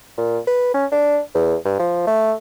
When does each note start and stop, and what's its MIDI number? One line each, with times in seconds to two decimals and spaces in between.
0.18 0.39 46
0.47 0.71 71
0.75 0.86 61
0.92 1.20 62
1.35 1.56 40
1.65 1.79 43
1.80 2.05 53
2.07 2.34 57